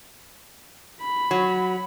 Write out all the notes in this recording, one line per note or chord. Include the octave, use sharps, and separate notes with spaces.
B5
F#3